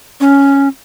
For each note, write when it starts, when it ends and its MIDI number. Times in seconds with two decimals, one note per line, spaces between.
0.21 0.68 61